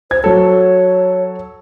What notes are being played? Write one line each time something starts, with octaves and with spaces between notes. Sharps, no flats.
C5 G#6
F#3 A4 C#5